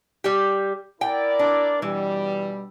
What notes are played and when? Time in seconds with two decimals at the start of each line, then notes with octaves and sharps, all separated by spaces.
0.24 G3 G4
1.01 E4 A#4 D5 G5
1.39 D4
1.82 B2 E3 G3